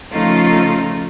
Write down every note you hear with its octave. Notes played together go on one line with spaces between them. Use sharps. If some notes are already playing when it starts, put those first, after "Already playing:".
C#3 F3 A3 D#4 F4